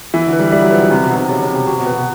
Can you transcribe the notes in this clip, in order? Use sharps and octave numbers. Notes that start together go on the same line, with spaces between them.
E3 E5
D3
B4
G3
G3 E5
F#3
F3 B4
C#3
C3 C4
B2
D#4
C3
C#3 G4
C#3
C4
C3
C3 F#4
B2
B4
B2